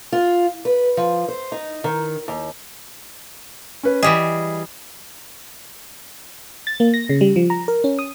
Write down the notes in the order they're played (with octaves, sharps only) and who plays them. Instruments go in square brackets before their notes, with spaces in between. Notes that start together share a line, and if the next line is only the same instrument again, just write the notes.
[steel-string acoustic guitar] F4
B4
F3
C5
D#4
D#3
D#2
[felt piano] C#4 B4
[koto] E3 G3 G#4 [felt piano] D#5
[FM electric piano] A6
A#3
A#6
C#3
G3
F3
A#5
A#4
C#4
D#6